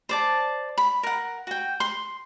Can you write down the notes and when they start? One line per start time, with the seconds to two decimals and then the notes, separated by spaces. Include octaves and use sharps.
0.09 C5 D5 A5
0.78 B5
1.03 A#4 F#5
1.47 F#4 G5
1.80 C6